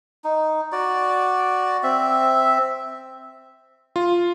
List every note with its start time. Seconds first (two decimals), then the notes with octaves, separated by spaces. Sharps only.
0.24 D#4
0.72 F#4 D5
1.83 C4 E5
3.96 F4